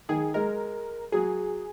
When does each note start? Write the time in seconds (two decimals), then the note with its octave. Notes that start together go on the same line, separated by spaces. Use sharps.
0.09 D#3 G#4
0.34 G#3 A#4
1.12 F#3 G#4